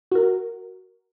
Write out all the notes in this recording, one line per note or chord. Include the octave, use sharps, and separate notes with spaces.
F#4 A#4